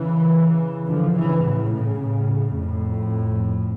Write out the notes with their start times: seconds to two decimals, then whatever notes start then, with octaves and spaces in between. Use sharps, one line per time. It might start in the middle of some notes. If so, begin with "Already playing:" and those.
Already playing: C#3 E3
0.87 D3 F3
1.15 C#3 E3
1.43 A2 C#3
1.71 A2 C#3
1.99 A2 C#3
2.55 F2 A2